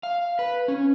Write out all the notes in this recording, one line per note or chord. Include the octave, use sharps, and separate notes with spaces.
F5
B4
C#4